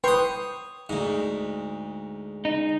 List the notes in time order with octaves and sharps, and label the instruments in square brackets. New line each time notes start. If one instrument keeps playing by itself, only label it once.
[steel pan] B4 G5 C6 [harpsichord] C#5 D#6
[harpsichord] D2 G#2
[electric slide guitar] D#4